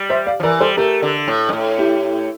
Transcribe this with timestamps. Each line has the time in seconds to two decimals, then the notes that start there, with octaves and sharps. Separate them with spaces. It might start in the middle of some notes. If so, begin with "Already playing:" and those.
Already playing: G3
0.10 C5 E5
0.26 D5 F5
0.40 F3
0.43 E3 A#4 D5
0.60 G3 A4 C5
0.77 A3 G4 A#4
1.02 D3
1.28 A2
1.49 G2
1.53 A2
1.78 E4 G4